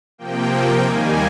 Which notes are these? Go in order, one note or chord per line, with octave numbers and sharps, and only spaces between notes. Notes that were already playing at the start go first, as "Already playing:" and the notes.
C3 F3 A#3 G5
G5
D#2 D#3 G3 A#3 G#5